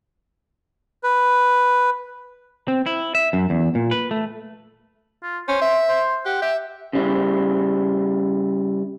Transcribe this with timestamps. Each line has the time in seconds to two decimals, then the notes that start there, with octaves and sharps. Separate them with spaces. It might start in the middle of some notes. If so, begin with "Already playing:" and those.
1.03 B4
2.68 C4
2.86 E4
3.15 E5
3.33 F#2
3.50 E2
3.75 A#2
3.91 B4
4.11 A3
5.23 F4
5.48 C#4 C5
5.61 E5
5.89 C5
6.26 G4 F#5
6.42 G4 E5
6.93 C#3 G3 E4